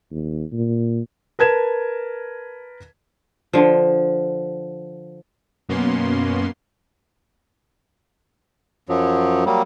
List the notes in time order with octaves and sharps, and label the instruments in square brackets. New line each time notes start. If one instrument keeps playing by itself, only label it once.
[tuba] D#2
A#2
[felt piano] A#4 B4 A5 G#6 E7
[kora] D3 F3
[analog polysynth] F#2 B2 A#3 B3 C#4 C6
[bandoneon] F#2 F3 F#3
F#3 G3 A#3